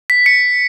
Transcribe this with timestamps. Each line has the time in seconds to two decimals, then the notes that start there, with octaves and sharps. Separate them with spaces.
0.10 B6
0.26 C#7